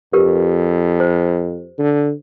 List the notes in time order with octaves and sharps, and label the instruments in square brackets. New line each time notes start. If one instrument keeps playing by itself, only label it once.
[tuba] F2 [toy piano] G4 A#4 B4
[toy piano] C5
[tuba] D3